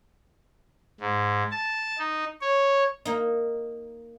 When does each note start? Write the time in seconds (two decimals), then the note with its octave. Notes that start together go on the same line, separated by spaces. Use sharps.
1.00 G#2
1.51 A5
1.99 D#4
2.41 C#5
3.05 A#3 D#4